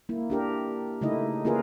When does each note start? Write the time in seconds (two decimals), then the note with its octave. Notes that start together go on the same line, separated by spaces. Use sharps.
0.09 A#3 E4
0.30 D4 G4 A#4
1.01 C#3 A3 D#4 E4 D#5
1.45 A#3 C#4 F4 G#4 A#4 B4